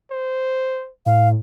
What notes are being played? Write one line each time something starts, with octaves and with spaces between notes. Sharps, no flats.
C5
A2 F5